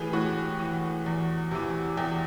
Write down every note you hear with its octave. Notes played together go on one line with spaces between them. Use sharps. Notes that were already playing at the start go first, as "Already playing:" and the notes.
Already playing: A2 E3 G4 G#4 B4
A2 F#4
E3
E2
C3 E3
E2 G4